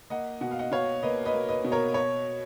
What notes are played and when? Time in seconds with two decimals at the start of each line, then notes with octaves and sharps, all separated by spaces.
0.10 A#3 D#5 F#5
0.41 B2 F#5
0.51 F5
0.59 D#5 F#5
0.71 B2 C#5 F5
1.03 A#3 B4 D#5
1.25 B4 D#5
1.34 A#3
1.49 B4 D#5
1.64 B2
1.72 A#4 C#5
1.94 C#5